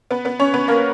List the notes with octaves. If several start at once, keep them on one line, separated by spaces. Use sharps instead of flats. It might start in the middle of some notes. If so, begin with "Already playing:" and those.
B3 B4
B3 B4
C#4 C#5
B3 B4
A#3 A#4